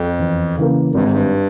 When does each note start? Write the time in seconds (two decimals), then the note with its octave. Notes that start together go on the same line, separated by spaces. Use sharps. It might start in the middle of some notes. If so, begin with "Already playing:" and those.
Already playing: F2
0.19 E2
0.57 C#3 E3 A#3
0.94 G#1 G2
1.03 G#2
1.12 G2